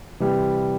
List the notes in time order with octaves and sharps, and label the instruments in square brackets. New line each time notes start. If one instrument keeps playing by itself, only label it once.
[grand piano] C3 E3 G3